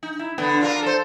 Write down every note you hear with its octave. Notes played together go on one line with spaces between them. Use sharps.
D#4
E4
D3 B3
D4 F4 A#4
A4 C5